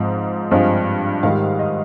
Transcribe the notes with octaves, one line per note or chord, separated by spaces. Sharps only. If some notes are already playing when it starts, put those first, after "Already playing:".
Already playing: G#2 F3 C4
G2 F3 G#3 C4 F4
G#2 D#3 G3 F5
D#5